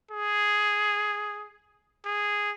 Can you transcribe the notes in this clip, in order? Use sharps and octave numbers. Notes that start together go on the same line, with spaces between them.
G#4
G#4